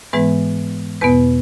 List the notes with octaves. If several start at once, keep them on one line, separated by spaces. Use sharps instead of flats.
G#2 E3 G#3 B3 B4
E2 B2 B3 B4